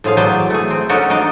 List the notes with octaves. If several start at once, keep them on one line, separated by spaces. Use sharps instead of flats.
A2 F3 G#4 F5
E3 F#3 G4 G#4 C5 D5
A3 G#4
C4
C#4 D#4 F#4 A4 A#4 D5
D4 D#4 D#5 F5